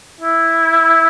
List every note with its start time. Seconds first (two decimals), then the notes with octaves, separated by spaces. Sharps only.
0.21 E4